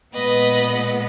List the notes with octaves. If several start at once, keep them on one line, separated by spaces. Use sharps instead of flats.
A#2 G#3 B3 B4 D#5